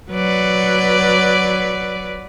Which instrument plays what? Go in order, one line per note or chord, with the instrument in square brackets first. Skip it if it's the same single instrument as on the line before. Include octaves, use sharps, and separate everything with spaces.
[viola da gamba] F#3 B4 D5